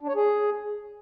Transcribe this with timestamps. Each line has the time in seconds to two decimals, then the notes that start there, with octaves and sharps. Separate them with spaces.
0.01 D4
0.08 C#5
0.16 G#4